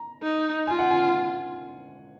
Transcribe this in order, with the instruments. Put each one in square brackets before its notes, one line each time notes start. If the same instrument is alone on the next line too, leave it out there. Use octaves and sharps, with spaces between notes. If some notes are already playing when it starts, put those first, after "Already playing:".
Already playing: [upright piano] A#5
[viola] D#4
[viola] F4 [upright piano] G#5
[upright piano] F#5
G#5